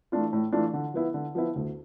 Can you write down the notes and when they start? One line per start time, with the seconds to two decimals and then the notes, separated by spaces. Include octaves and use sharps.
0.12 E3 A3 D4 F4
0.33 A2
0.52 E3 A3 D4 F4
0.73 D3
0.94 F3 B3 E4
1.14 D3
1.35 F3 B3 E4
1.56 D2